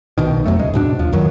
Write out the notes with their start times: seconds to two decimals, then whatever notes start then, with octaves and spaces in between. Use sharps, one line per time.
0.18 B1 B2 D#3
0.45 F2 B2 F#3 A3
0.59 C#2 G#3
0.74 G#2 B2 D4
0.99 D#2 F3
1.12 C#2 F#2 D#3 F#3